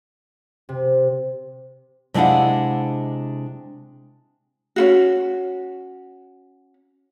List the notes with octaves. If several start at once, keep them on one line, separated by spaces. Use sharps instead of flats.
C3
C3 G#3 D4 E4 F5 F#5
C#4 F4 F#4